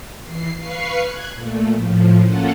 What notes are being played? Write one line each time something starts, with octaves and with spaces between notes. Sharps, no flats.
E3 C7
B4 F5 C#6 C7
F#6 G#6
A#2 A3
A2 F3
A#3 C#4 F4 A4 F#5